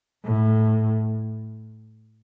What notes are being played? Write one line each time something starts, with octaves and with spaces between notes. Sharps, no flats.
A2